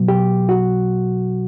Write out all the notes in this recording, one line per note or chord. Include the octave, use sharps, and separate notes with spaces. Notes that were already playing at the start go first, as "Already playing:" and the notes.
Already playing: B2 F#3
G4
F#4